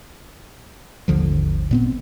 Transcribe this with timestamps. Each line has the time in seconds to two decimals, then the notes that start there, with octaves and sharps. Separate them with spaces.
1.08 G#1 D#2 D3 F3
1.71 A#2 B3 C4